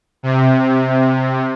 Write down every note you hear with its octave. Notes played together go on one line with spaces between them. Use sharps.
C3